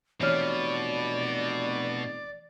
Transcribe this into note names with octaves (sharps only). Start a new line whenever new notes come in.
F1 B2 E3 C#5 D5 F6